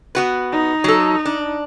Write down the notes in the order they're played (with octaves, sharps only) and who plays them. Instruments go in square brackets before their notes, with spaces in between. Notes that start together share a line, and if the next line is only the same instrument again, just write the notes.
[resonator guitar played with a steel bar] B3 F#4 B4
[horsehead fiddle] D#4
[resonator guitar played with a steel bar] F#3 A4
D4